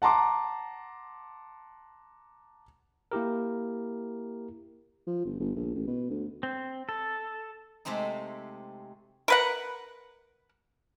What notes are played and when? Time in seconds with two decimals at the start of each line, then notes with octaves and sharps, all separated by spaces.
0.02 F#5 A5 A#5 C6 D6
3.12 A#3 E4 G4 A#4
5.07 F3
5.25 G1
5.40 G1
5.56 A#1
5.74 A1
5.87 B2
6.10 D2
6.43 C4
6.89 A4
7.85 C3 G#3 A3 C4 D#4
9.28 A#4 B4 F#5